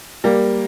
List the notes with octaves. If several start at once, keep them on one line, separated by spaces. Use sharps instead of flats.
G3 A#3